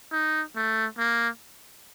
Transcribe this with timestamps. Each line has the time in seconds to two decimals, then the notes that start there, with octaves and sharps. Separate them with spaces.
0.12 D#4
0.56 A3
0.98 A#3